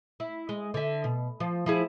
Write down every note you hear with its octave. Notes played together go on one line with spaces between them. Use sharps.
E4
G#3
D3 E5
B2
F3
F3 E4 G#4